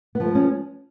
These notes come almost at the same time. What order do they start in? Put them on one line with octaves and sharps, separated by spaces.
B3 F3 A3 G#3 C#4